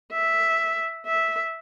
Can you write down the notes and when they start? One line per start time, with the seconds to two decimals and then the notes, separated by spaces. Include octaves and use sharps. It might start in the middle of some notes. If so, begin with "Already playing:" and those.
0.12 E5
1.06 E5